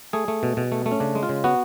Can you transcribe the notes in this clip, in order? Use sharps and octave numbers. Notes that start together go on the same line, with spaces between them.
A3 G#4
A3
B2
B2
A3
A3
C#4
C#3 D4
G#3
F4
C#3
B3 F#4